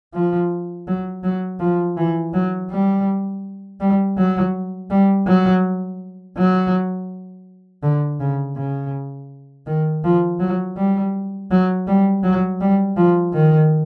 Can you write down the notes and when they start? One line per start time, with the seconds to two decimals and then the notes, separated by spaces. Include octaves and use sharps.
0.14 F3
0.88 F#3
1.23 F#3
1.60 F3
1.97 E3
2.34 F#3
2.71 G3
3.80 G3
4.18 F#3
4.90 G3
5.27 F#3
6.38 F#3
7.83 D3
8.20 C#3
8.56 C#3
9.67 D#3
10.04 F3
10.40 F#3
10.77 G3
11.51 F#3
11.87 G3
12.23 F#3
12.61 G3
12.96 F3
13.33 D#3